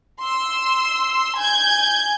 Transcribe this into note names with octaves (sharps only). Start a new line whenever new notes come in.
C6 E6
G#5 G6 G#6